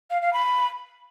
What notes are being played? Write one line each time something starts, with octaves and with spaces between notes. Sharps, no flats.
F5
F5
B5